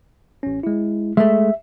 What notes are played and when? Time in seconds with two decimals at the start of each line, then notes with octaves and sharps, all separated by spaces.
0.43 A1 C#4
0.63 G#3 E4
1.17 G#3 A3 E5